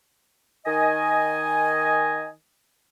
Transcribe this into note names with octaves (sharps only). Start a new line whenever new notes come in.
D#3 D#5 G#5